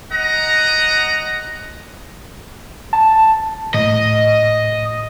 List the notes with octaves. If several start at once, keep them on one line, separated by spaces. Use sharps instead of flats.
D#5 F#5 A#5
A5
A2 D#5